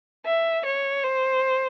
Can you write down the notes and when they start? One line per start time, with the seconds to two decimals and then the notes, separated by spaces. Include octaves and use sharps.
0.26 E5
0.65 C#5
1.04 C5